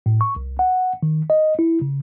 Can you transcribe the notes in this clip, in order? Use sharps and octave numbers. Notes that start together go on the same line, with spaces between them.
A2
C#6
C2
F#5
D#3
D#5
E4
C#3